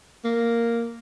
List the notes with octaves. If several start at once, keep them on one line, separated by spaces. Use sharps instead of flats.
A#3